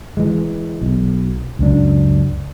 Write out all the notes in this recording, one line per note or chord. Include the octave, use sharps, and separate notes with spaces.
E3 G#3
B1
C#2 F#2 D4